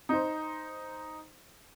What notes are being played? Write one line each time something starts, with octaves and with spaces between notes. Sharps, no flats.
D#4 C5